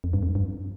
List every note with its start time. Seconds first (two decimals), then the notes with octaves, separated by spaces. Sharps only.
0.04 F2
0.13 G2
0.23 F2
0.35 G2